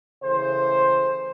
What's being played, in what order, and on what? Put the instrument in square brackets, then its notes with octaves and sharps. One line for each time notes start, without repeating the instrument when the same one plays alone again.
[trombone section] C#3 E3 A3 C5